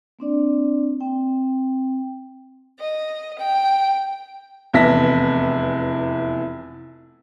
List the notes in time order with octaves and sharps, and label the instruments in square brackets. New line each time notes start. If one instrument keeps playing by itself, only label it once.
[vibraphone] A#3 C4 D4 D5
C4 G5
[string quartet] D#5
G5
[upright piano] F1 E2 E4 A5 A#6 B6